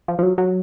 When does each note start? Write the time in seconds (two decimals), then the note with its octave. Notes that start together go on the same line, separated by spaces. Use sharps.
0.08 F3
0.19 F3
0.23 F#3
0.38 F#3